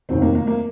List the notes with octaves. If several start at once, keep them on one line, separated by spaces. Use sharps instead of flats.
F1 D#2 D#3 C4
A#3
A#3
A#3